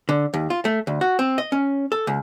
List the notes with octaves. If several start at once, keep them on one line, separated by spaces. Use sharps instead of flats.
D3
D#2
F4
A3
D2
F#4
C4
D#5
C#4
A4
C#2